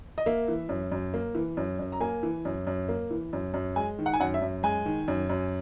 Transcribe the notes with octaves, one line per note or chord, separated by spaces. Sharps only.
D#5
A#3 E5
E3
F#2
F#2
A#3
E3
F#2
F#2
A#5
A#3 G#5
E3
F#2
F#2
A#3
E3
F#2
F#2
G#3 G#5
D#3
F#5
G#5
F#2 F#5
E5
F#2
G#3 G#5
D#3
F#2
F#2